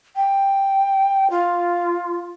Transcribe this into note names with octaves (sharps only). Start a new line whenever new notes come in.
G5
F4